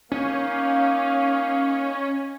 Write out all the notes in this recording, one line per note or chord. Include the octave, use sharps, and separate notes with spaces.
A#3 C#4 D#4 F5